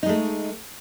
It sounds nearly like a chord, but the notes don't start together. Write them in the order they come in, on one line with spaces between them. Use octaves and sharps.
D#4 G#3 A3